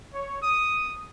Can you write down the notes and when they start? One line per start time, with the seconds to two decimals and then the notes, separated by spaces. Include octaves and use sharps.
0.14 C#5
0.42 D#6